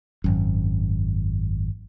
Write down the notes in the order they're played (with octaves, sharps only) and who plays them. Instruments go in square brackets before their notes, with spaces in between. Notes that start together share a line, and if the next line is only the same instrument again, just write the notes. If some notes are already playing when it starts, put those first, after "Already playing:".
[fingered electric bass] G#1 F#2